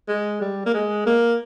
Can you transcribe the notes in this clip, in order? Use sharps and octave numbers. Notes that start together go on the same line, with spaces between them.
G#3
G3
A#3
G#3
A#3